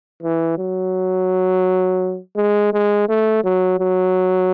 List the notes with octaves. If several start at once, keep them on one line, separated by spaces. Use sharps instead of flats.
E3
F#3
G#3
G#3
A3
F#3
F#3